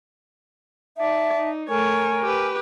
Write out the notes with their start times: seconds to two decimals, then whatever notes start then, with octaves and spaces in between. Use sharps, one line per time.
0.99 D#4 D5 E5 A5
1.38 D#4
1.69 A3 A#4 C#5 G#5
2.23 G4 B4